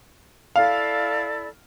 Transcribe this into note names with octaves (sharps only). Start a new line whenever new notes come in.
E4 A4 D5 F5